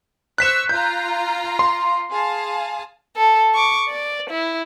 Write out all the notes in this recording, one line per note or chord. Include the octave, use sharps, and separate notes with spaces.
C5 C#6 E6 F#6 B6 E7
F4 F5 A#5 G6
C6
G#4 F5 A5
A4
C#6 D6
D5
E4